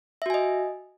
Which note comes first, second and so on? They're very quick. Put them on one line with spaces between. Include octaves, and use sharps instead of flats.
E5 F#4 G#5 D#5